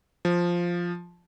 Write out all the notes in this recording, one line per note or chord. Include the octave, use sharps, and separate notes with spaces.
F3